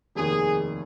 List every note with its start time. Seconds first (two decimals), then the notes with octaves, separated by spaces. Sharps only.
0.15 F1 D#2 D#3 G#4